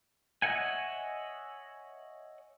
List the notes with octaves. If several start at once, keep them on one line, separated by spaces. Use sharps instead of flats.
C#5 D#5 E5 F#5 G#5